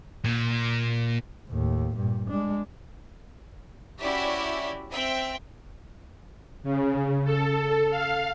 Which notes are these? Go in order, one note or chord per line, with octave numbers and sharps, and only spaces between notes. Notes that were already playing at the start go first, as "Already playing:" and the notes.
A#2
D#2 A2
G2 A#2
G#3 D4
C#4 E4 F#4 G4 D5 E5
C4 E5 G5
C#3
A4
F5